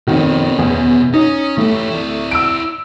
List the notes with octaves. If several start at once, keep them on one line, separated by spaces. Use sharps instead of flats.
F2 B2 D#3 C#4
E2
C#4 D#4
E3 A3 G4
E4 D5
E6 D7